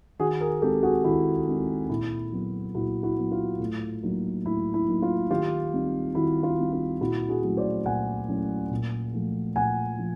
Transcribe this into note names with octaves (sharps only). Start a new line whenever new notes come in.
D#3 F#4 G#4
G#4 A#4
G#3 C4 D#4 G4 A4
F#4 G#4
D#3 E4 F#4
G#3 C4 D#4
A#2 E4
F#3 B3
A#2 E4 F#4
E4 F#4
F#3 B3
F4
A2
F#3 A#3 D#4
A2 E4
E4
F#3 A#3 D#4
F4
D#3 F4 G4
G3 C4 D#4
D#3 E4 F#4
F4
G3 C4 D#4
F4
A#2 E4 F#4
F#4 G#4
F#3 A3 C#4 E4
C5 D5
A#2 F#5 G#5
F#3 A3 C#4 E4
A#2
F3 A3
A#2 F#5 G#5
F3